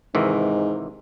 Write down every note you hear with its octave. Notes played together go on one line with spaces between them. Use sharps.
G#2 C3 D#3 E3